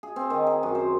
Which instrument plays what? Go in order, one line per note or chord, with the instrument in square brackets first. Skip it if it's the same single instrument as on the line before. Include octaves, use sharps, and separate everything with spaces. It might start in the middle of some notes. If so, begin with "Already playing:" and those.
[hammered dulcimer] G#4
C4
D#3
G#4
F#2
C5